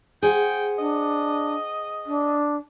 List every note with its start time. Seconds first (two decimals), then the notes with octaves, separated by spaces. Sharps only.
0.23 G#4 C5 F#5 G5
0.78 D4 D#5
2.06 D4